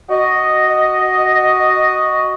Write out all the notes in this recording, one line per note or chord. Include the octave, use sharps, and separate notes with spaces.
F#4 D#5